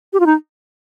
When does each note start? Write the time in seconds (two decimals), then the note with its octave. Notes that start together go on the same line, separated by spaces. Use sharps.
0.13 G4
0.20 F4
0.26 D#4